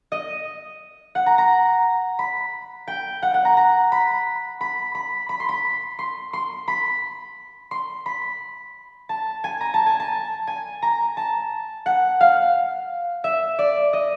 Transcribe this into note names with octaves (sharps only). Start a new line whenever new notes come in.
D#5
F#5
A#5
A#5
B5
G5
F#5
F#5
A#5
A#5
B5
B5
B5
B5
C6
B5
C6
C6
B5
C6
B5
A5
G#5
A#5
A5
G#5
A5
G#5
A#5
A5
F#5
F5
E5
D5
D#5